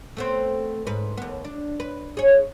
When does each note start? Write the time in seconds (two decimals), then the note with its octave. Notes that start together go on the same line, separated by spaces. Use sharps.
0.17 A3 B3 C4
0.87 G#2 B4
1.17 D#2 B3
1.44 D4
1.80 B4
2.17 G#4 C#5